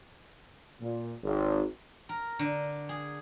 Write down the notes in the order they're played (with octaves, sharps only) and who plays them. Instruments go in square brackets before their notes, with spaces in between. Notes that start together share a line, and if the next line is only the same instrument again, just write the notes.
[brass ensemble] A#2
G#1
[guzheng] A#4
D3
G#4